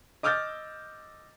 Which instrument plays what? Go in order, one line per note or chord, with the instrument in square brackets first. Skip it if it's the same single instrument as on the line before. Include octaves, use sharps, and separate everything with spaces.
[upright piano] D#5 D6 E6 F6 G6 A6